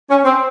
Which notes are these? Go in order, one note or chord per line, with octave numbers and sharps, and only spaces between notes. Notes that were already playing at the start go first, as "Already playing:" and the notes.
C#4
C4